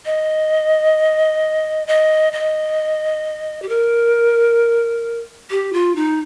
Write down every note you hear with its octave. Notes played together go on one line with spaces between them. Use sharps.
D#5
D#5
D#5
G4
A#4
G4
F4
D#4